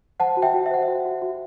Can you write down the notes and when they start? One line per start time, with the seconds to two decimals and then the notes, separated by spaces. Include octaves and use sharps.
0.20 C5 F#5 A5
0.37 F#4
0.42 E5 G5
0.54 F#4
0.66 E5
0.71 C5 F#5
0.83 E5
0.88 F#4
1.05 F#4
1.22 F#4